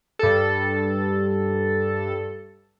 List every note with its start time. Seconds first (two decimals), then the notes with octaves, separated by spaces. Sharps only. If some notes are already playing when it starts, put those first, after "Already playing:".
0.19 G2 A4